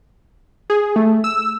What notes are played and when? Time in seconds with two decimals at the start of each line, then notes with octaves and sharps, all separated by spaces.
0.70 G#4
0.96 A3
1.24 E6